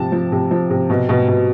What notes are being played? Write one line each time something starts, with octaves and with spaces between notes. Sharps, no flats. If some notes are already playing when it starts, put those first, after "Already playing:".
Already playing: C3 F3 A5
F3
C3
F3
C3
B2
B2
B2